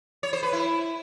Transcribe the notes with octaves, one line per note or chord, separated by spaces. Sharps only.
C#5
C5
B4
E4